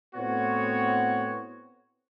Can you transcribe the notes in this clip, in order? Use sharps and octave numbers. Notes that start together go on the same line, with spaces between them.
A2 B3 C4 F#4 C#5